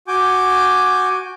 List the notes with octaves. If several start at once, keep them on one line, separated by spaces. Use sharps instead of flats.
F#4 G#5 D6 G6